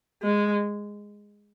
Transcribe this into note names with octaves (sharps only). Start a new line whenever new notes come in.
G#3